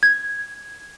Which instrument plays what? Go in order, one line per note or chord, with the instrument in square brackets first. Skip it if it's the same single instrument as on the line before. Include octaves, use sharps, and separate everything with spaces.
[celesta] G#6